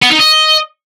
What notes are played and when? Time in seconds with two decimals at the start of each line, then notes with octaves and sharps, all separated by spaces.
0.02 B3
0.11 D#4
0.20 D#5